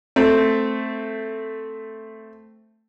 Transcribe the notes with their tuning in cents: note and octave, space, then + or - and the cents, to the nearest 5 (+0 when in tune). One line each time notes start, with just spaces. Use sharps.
A3 +5 C4 +0